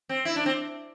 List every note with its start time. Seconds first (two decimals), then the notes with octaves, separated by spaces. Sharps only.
0.09 C4
0.25 E4
0.36 D4
0.46 C4